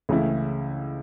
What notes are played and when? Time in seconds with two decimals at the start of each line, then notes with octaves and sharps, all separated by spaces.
0.09 C#2 C#3 E3 A3 E4